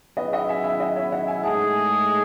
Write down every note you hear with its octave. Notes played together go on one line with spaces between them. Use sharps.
F#3 C#4 E4 G#4 B4 D#5
D#5 F#5
E5 G#5
E5 G#5
D#5 F#5
C#5 E5
D#5 F#5
E5 G#5
A2 G#3 D#4 G#4 F#5 A5